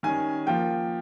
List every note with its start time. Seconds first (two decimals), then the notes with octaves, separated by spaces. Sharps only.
0.03 D#3 G3 C#4 G#5
0.47 F3 A#3 F4 G5